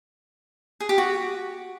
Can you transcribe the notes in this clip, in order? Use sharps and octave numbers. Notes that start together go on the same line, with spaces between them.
G#4
G4
F#4